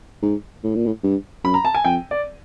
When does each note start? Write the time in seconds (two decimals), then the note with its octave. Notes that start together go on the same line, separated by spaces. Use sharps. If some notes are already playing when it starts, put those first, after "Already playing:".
0.23 G#2
0.64 A2
0.75 A#2
0.86 A2
1.04 G2
1.44 F#2 B5
1.54 A#5
1.65 A5
1.75 G#5
1.85 F2 G5
2.11 D5